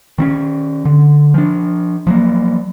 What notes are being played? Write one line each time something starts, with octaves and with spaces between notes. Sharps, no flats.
D#3 C4 C#4
D3
F3 D4
F3 F#3 A#3